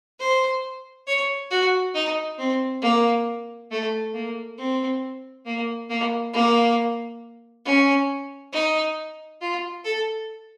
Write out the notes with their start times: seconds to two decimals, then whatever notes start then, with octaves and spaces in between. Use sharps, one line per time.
0.19 C5
1.07 C#5
1.50 F#4
1.94 D#4
2.38 C4
2.82 A#3
3.71 A3
4.14 A#3
4.58 C4
5.46 A#3
5.89 A#3
6.33 A#3
7.65 C#4
8.53 D#4
9.41 F4
9.84 A4